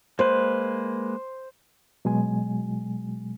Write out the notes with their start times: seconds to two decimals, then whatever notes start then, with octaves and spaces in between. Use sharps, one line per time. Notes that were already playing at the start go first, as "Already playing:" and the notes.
0.19 G#3 A#3 B4 C5
2.05 B2 F#3 G#3 G#5